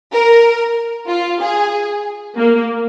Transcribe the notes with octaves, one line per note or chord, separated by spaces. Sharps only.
A#4
F4
G#4
A#3